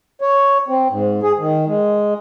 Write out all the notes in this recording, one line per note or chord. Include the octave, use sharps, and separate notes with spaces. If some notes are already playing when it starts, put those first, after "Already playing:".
C#5
C4
G#2
G#4
D#3
G#3